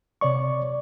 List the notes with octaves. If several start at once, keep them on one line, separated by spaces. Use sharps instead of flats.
C3 C#5 D5 C#6